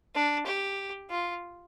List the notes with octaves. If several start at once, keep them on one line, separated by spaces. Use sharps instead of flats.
D4
G4
F4